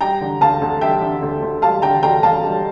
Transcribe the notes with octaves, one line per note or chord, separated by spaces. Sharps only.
G3 G5 A#5
D3
D2 F5 A5
D2
G3 E5 G5
D3
D2
D2
G3 F5 A5
D3 G5 A#5
D2 G5 A#5
D2 F5 A5
G3